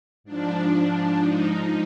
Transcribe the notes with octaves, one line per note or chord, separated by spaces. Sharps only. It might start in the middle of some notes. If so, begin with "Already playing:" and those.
G#2 F3 D4
D#4